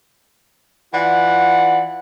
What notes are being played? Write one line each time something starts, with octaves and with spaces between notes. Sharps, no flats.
E3 F4 D5 F#5